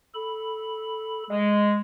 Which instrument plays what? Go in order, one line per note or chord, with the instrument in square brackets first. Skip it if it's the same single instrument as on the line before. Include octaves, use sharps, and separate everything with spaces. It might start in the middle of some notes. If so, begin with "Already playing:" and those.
[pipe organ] A4 B5
[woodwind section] G#3